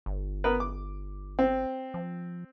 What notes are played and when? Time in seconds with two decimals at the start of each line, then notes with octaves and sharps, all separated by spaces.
0.06 G1
0.44 B3 A#4 B4
0.60 D6
1.39 C4
1.94 F3